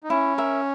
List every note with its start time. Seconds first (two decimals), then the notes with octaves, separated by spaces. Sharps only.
0.04 D#4
0.10 C#4 E4
0.38 A#4 E5